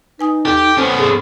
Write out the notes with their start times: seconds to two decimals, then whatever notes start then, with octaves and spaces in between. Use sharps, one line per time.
0.19 D#4 B4 G#5 D#6
0.45 D#2 G4 A4
0.78 B3 C#4 A4 C5 G#5
0.99 G#2 G#4 A4 B5